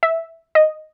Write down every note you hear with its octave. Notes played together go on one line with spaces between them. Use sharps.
E5
D#5